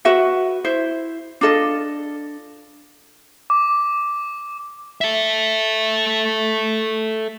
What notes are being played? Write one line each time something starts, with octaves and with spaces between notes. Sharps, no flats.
F#4 B4 E5 F#5
E4 C5 E5
D4 F4 A4 D#5
D6
A4 E5